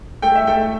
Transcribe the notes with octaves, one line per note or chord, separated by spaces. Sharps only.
A3 G5
E5
A3 G5